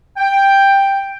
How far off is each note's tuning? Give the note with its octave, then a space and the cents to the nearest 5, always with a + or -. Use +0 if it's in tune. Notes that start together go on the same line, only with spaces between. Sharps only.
G5 +5